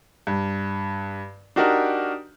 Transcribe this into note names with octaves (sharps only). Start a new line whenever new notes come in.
G2
D4 D#4 F#4 G4 A#4